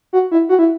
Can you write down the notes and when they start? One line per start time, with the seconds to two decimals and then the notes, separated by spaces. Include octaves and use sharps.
0.13 F#4
0.31 E4
0.49 F#4
0.59 E4